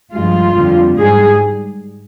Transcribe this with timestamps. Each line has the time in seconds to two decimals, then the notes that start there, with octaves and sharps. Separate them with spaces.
0.13 G2 F3 G#3 F4
0.55 F2 D3 G3
0.97 G#2 G3 G#4